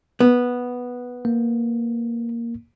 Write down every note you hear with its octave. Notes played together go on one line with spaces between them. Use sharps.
B3
A#3